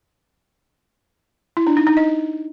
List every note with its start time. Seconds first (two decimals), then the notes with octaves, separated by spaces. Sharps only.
1.57 E4
1.67 D4
1.77 D#4
1.87 D#4
1.97 D#5